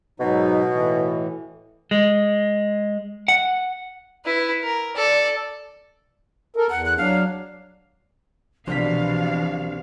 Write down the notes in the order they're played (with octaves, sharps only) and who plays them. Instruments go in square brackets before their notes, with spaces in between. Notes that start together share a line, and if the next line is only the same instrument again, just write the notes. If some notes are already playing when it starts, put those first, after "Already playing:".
[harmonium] G#2 F#3 D#4 [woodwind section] B2
[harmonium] A2 E3
[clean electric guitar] G#3
F#5
[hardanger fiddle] E4 B4
A#4
A4 D5
[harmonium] A4 A#4
[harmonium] E2 [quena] F#5
[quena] F#6
[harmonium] F#3 D4 [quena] F5
[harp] C2 C5 B6 [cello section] B2 E3 F5 [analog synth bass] F3 [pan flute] D4